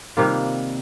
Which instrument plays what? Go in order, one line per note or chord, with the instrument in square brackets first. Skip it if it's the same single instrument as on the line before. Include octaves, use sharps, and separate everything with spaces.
[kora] C3 D#3 G3 A#3 F4